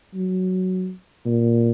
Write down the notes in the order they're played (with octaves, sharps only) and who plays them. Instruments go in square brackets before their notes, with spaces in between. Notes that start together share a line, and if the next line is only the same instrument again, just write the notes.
[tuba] F#3
A#2